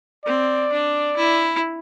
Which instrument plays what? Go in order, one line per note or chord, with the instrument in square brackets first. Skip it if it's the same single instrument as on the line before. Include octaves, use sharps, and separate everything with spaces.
[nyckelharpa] C4 [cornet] D5
[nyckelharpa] D4
E4